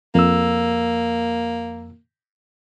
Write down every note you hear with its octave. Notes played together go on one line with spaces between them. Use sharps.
F2 A#3 E6